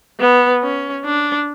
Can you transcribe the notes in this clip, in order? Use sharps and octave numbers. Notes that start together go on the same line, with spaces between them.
B3
C#4
D4